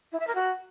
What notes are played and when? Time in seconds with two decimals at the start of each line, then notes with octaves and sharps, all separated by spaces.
0.12 E4
0.20 E5
0.27 A#4
0.35 F#4